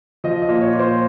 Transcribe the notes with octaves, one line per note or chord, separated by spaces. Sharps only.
F3 D#5
D#5
A#2
C#5
A#2
C5